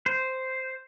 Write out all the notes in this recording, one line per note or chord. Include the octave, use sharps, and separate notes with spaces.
C5